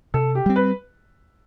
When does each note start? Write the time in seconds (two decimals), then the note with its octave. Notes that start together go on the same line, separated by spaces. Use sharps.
0.14 C3 A4
0.35 G4
0.46 G3 C4
0.56 B4